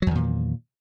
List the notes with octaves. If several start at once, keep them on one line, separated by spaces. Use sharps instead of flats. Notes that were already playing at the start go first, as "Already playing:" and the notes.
E2 A#2 D#3 F#3